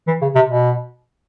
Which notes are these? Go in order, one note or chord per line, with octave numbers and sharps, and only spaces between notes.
E3
C#3
C3
B2